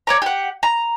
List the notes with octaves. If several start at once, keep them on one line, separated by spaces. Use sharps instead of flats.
C#5 D5 A#5
G4 F#5
A#5